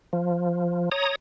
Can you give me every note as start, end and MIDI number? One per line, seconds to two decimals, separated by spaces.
0.13 0.89 53
0.92 1.15 73
0.92 1.15 82
0.92 1.15 87